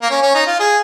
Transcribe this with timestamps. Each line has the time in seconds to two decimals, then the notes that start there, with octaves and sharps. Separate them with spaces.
0.02 A#3
0.11 C#4
0.22 C#4
0.34 D#4
0.47 F4
0.60 G#4